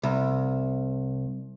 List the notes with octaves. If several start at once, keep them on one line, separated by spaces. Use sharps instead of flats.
C2